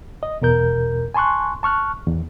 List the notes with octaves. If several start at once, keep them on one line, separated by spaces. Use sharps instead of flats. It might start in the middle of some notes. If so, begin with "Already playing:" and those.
D#5
E2 B2 A#4 G6
G#5 A5 C6 C#6 F#6
A5 C#6 F6 F#6
E2